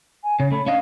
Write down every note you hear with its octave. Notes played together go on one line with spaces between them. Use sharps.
G#5
C#3 C#5
A3 B5
C#4 D4 D#5 F5